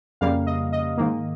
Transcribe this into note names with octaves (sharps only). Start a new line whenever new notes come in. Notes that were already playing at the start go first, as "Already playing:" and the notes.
F2 C#3 G3 A#3 F5
D#5
D#5
G#2 D#3 A#3